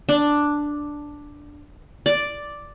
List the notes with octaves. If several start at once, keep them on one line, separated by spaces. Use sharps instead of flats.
D4
D5